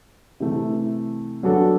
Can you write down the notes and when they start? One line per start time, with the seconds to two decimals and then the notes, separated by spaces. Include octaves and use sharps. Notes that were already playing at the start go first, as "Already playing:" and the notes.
0.40 C3 E3 A3
1.43 F#3 B3 D4 F#4 A4